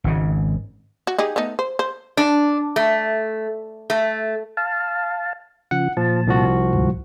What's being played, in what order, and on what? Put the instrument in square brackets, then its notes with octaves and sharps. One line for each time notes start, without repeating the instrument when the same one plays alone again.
[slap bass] G#1 G#2 C#3
[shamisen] F#4
D#4 G4 G#4
A3 B3 D#4
C5
C5
[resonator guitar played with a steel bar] D4
A3
A3
[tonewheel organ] F5 A5
[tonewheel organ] C#3 F3 [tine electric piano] F#5
[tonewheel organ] A#2 A5 [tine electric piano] F3
[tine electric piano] C2 F3 F#4
[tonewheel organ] D2 G#2